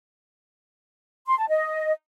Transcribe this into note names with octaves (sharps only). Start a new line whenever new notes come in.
C6
A5
D#5